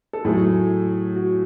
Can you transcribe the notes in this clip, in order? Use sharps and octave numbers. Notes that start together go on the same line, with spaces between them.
A4
A2 F#3 A3 G#4
F#4